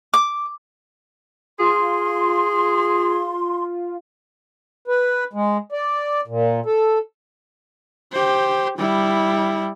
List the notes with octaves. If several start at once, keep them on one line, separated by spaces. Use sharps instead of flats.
D6
F4 G#4 C6
B4
G#3
D5
A#2
A4
G4 C5
G3 E4